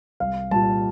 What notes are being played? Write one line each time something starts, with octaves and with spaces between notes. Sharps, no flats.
C2 F5
A#2 G3 A5